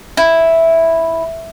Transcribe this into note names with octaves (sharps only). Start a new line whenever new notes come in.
E4